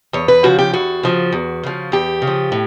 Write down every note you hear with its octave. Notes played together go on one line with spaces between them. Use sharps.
E2 C#5
B4
C#3 F3 F#4
G4
E2 F#4
C#3 F3
E2
C#3 F3
E2 G4
C#3
F3
A2